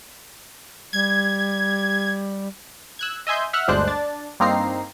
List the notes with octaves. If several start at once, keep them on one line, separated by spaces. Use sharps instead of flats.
G3 G#6
E6 F#6 G#6
D#5 E5 G#5 C6 G6
E5 F#5 F6 F#6
G1 D2 G#3 D4 C5 F#6
D4 A6
G2 A#3 C4 D#4 A#5 C7